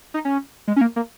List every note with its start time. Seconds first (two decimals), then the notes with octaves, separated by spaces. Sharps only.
0.14 D#4
0.25 C#4
0.68 G#3
0.76 C#4
0.81 A#3
0.96 A#3